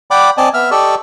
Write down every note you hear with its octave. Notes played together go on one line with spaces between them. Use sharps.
D5 F#5 G5 B5 D6
C4 D5 D#5 G#5 A5
B3 E5 E6 F6
G4 A4 D5 D#5 C#6 E6